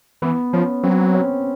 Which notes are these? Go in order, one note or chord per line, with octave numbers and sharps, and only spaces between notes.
E3 B3
F3 C#4
F#3 C4
C#4